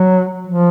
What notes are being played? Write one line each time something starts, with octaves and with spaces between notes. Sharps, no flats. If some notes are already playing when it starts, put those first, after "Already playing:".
Already playing: F#3
F3